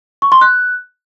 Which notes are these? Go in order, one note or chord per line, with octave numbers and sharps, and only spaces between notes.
C#6
C6
F#6